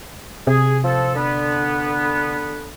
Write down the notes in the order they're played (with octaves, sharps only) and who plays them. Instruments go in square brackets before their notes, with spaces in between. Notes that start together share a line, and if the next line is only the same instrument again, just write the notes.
[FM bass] C3 [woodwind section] G#4
[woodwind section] F3 A4
D3 B3